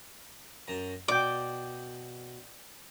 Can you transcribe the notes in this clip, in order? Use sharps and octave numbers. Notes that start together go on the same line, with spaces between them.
F#2 A#5
B2 D5 G5 D6